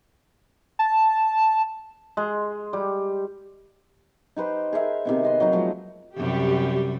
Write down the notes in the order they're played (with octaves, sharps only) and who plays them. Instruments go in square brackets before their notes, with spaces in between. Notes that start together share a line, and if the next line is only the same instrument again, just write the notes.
[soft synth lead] A5
[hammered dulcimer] G#3
G3
D#4 G4 B4 C5
G#4 A#4 E5 F5
C3 D#3 B3
B4 D#5 C6
F#3 A#3 D#4 D#5
F3 F#3 G#3 A3
[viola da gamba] F#2 C3 G3 [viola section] G4